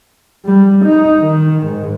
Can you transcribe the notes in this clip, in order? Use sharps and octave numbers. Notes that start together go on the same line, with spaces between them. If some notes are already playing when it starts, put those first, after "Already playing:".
G3
D#4
D#3
G#2